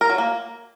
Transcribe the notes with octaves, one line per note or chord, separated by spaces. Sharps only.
A#4
F#3
A#3